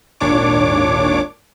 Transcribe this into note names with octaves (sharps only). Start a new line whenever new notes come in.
G#1 D#2 A#2 D4 C#5 D6